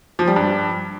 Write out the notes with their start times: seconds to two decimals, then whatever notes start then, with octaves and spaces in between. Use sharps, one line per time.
0.19 F3
0.28 G3
0.36 G2